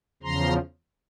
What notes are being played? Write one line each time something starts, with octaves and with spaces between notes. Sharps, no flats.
E2 C#3 F3 A#5 C6